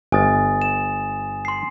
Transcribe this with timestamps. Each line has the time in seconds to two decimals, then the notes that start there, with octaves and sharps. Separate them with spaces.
0.12 G1 G#5 D#6 A6
0.62 E7
1.45 C6 C7